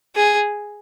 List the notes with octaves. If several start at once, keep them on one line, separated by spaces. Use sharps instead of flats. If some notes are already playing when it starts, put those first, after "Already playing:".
G#4